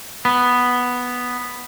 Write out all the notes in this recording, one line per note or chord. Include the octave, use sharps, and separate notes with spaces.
B3